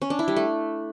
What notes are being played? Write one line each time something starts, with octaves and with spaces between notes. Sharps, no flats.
C#4
D4
E4
G3
A3